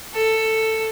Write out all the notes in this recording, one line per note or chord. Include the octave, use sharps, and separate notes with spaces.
A4